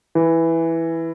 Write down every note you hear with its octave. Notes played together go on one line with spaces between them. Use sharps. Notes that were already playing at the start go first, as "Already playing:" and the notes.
E3